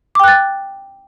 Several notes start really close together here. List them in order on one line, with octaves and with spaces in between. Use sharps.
D6 G5 F#6 A6